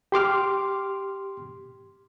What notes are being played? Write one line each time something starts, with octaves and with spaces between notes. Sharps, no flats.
G4 C6 D6 F6